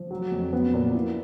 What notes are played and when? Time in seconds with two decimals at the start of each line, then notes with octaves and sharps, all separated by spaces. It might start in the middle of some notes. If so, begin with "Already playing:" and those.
Already playing: F3
0.11 F#3
0.32 F2
0.53 B3
0.73 A#2
0.95 E4